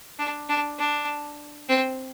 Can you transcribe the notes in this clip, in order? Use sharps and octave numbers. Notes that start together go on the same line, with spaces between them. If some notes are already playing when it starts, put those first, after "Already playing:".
D4
D4
D4
C4